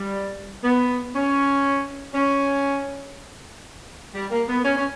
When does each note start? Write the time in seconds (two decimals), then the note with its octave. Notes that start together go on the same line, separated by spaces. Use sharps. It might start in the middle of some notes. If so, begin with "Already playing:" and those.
Already playing: G3
0.64 B3
1.14 C#4
2.14 C#4
4.14 G3
4.31 A#3
4.48 B3
4.65 C#4
4.77 C#4